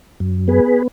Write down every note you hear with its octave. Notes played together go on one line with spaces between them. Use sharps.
F#2
B3 G#4 B4